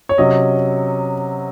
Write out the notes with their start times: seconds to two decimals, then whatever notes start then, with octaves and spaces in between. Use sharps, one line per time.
0.09 C#5
0.18 C3 F#3 C#4 D#5